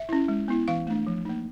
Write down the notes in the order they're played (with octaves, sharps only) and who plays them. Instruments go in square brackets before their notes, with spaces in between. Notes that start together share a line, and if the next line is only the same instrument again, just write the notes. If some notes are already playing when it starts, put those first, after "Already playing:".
Already playing: [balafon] E5
C#4 E4
G#3
B3 E4
E3 F5
A3 D4
F3
A#3 D#4